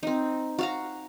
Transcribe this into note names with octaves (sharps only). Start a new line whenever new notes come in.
C4 D#4
F#4 F5 A#5